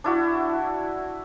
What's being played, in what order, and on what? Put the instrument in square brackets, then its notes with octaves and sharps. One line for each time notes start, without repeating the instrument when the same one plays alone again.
[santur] D4 E4 F#4